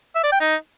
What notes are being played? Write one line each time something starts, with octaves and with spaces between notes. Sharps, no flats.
E5
D5
G5
D#4